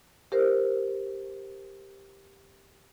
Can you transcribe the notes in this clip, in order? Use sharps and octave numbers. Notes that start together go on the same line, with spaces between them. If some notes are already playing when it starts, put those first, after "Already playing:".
G4 A#4 C5